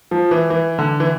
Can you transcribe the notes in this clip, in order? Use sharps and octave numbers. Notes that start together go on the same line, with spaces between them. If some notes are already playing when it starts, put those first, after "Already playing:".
F3
E3
E3
D3
E3